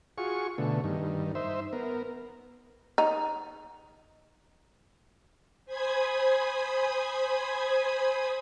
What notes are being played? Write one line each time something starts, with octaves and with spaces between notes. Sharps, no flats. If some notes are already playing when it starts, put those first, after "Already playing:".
F4 F#4 G#4 C#6
B2 D3 A3
G2 D#3
D#4 C5 E5
B3 A#4
D#4
C5 G#5 B5 D#6 G#6